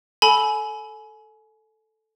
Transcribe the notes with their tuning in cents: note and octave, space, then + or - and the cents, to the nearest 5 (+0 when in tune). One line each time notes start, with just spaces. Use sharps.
A4 +0 G#5 +30 B5 -5